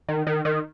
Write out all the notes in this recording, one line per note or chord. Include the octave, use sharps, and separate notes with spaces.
D#3
D#3
D#3